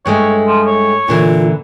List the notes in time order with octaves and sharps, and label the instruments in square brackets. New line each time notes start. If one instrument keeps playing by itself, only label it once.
[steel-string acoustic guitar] G2 G#3 A3 [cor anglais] C#5
[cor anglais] F3
C#5
[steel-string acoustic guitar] A#2 D3 E3 [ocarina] F4